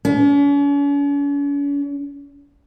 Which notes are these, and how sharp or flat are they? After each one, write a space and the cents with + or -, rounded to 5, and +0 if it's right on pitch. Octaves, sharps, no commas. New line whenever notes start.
C#4 +45